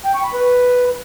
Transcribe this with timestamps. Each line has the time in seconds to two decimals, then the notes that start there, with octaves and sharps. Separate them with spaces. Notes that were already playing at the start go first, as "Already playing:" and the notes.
0.05 G5
0.14 C#6
0.24 B5
0.33 B4